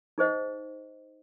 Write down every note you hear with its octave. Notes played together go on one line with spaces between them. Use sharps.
D#4 G#4 C5 D#5 F#5